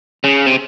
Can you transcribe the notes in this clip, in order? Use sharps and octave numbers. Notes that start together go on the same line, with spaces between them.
C#3
C3